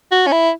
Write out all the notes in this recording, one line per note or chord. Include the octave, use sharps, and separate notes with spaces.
F#4
C#4
E4